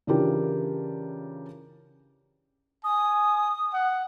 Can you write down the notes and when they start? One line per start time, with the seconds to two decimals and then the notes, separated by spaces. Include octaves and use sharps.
0.07 C#3 E3 D4 F4 G4 A#4
2.84 G#5 D#6
3.73 F#5